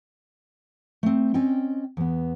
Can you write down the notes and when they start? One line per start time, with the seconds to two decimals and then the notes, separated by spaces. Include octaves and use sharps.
1.03 A3 C4
1.34 C4 C#4 D5 D#5 G5
1.97 E2 B3